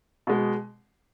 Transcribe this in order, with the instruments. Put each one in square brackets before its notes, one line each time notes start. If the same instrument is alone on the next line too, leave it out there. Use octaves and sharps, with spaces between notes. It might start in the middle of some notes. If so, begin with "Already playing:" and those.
[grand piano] B2 G#3